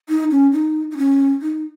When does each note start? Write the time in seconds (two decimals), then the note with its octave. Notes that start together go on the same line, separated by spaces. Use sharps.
0.09 D#4
0.31 C#4
0.53 D#4
0.91 D#4
0.97 C#4
1.42 D#4